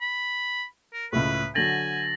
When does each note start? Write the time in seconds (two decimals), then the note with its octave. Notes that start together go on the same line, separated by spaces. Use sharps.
0.01 B5
0.94 A#4
1.13 C#2 A2 B4
1.55 D3 F#3 G#5 A6 A#6 F#7